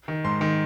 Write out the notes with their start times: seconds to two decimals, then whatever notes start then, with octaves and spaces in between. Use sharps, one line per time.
0.08 D#3
0.24 G#2 C6
0.41 D#3